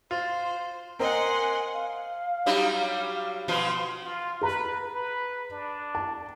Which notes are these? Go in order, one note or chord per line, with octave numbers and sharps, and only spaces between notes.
F4 C5
C4 A#4 D#5 F#5 G#5 C6
F5
F#3 G3 D#4
B2 F3 F4
F4
G#4 B4 A#5
B4
D4
A5